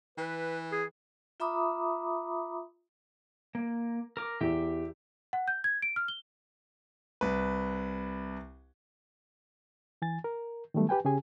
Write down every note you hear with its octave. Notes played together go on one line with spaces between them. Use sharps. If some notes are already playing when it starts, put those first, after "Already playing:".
E3 B4
G#4
F4 E5 A#5 B5 D6 D#6
A#3
A#4 D6
E2 G4 E5
F#5
G6
G#6
D7
F6
G7
C2 B4
E3 G#5 A6
A#4
D#3 F#3 G3 A3 B3
G4 B4 G5 G#5
C#3 C#4 G4 G#4 G#5